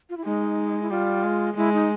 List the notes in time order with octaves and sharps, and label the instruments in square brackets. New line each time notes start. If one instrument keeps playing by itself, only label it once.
[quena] F4
E4
[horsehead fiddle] G#3 [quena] D#4
[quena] E4
[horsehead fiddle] G3 [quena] F4
[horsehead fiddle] G#3
[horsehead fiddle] G#3 [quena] E4
[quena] D#4